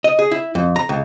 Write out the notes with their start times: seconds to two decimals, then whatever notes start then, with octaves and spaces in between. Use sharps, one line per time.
0.04 D#5
0.19 G#4
0.31 E4
0.55 F2
0.76 A#5
0.89 C#2